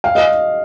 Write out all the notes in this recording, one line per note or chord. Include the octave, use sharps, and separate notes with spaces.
F5
D#5